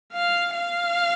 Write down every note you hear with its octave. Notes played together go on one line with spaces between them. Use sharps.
F5
F5